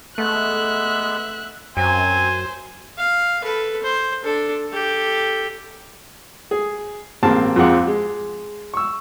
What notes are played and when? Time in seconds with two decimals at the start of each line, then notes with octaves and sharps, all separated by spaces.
0.18 G#3 A3 B3 E5 F#6
1.77 F#2 F#3 C4 C5 G#5
2.98 F5
3.42 A4 B4
3.82 C5
4.24 D4 A4
4.68 G4 A4
6.51 G#4
7.23 A1 G#3 A#3 C4 A5
7.56 F2 F3 G#3 C4 F#5 D6
7.87 G#3
8.74 C#6 E6